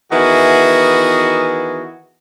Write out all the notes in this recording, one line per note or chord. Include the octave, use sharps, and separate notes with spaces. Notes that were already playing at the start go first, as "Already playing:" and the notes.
D#3 E3 B3 E4 F#4 G#4